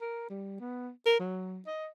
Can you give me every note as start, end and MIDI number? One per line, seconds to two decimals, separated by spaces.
0.01 0.26 70
0.30 0.58 55
0.60 0.90 59
1.06 1.19 70
1.19 1.60 54
1.67 1.88 75